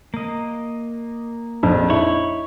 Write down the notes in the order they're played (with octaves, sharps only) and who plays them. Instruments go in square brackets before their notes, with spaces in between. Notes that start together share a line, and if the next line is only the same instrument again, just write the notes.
[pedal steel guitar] A#3 D#5
[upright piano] A#1 F2
[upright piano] D#4 E4 [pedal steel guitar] C#5 B5 C#6